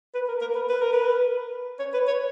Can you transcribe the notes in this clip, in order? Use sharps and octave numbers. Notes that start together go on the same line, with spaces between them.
B4
A#4
A#4
B4
B4
A#4
B4
C#5
B4
C#5